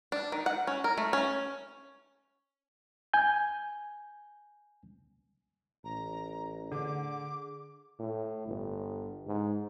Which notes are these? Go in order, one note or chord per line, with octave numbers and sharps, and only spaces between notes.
D4
D#3
F#5
C#4
A#4
A3
C#4
G#5 G6
A1 A#5
D3 G#4 D6
A2
G1
G#2